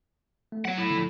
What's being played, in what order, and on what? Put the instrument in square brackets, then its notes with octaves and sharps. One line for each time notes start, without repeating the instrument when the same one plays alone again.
[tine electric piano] A3
[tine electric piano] F#3 B3 [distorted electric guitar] C#5 F#5
[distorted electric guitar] A2 E4
[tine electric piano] D3 F3